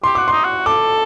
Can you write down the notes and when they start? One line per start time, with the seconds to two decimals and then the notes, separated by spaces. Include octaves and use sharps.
0.04 G4 C6
0.15 F#4 D6
0.28 D#4 C6
0.45 F#4
0.66 A4 D6